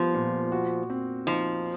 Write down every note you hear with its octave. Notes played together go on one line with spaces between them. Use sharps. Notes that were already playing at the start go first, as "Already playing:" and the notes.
Already playing: F3 G3 B3
A#2
F#4
C4
F3 D#4